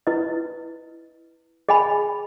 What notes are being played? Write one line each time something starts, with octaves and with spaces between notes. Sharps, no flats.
E4 B4 D#5
G#4 D#5 G#5 B5